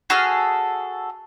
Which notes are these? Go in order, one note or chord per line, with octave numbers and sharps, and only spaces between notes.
F#4 G#4 A4 F6